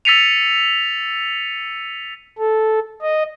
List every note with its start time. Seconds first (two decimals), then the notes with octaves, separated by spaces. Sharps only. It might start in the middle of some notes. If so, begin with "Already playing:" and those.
0.05 E6 A6 B6 C#7 D#7 F7
2.38 A4
3.02 D#5